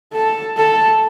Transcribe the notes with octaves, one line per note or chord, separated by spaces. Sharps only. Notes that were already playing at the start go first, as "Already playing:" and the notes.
A4
A4